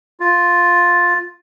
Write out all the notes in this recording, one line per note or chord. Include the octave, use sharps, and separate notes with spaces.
F4